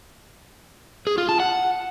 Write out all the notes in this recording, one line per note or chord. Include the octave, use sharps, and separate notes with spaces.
G#4
F4
A5
F#5